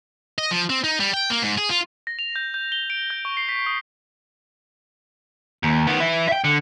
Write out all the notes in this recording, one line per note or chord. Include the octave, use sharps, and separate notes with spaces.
D#5
F3
C4
D#4
G3
G5
A#3
G#2
G#4
F4
A#6
F7
G6
G6
G7
D7
G6
C#6
C7
B6
D#6
D#2
D#3 B3
E3 E4
E5 G5
D3